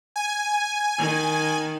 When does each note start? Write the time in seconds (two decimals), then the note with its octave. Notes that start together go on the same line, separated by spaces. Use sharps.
0.16 G#5
0.98 D#3